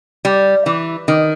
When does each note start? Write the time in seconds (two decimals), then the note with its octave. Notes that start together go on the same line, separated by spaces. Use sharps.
0.25 G3
0.66 E3
1.08 D#3